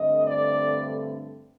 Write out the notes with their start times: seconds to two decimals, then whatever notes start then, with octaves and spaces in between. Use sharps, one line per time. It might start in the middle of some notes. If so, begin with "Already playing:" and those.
Already playing: G2 D3 A3 C4 D#5
0.25 D5